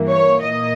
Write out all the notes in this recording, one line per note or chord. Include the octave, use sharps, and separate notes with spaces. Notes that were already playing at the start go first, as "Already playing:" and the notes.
Already playing: G2 E3 A#3
C#5
A#2 A#3 D#5